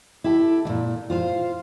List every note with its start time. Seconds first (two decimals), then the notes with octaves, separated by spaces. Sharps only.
0.24 E4 G4 A4
0.65 D#2 A#2
1.10 F4 C5 F5